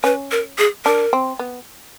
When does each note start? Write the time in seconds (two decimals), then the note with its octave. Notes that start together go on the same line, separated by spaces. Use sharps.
0.04 C#4 B4
0.31 A#4
0.58 G#4
0.85 D4 A#4
1.13 C4
1.39 B3